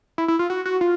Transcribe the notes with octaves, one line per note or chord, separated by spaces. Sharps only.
E4
E4
F4
F#4
F#4
F4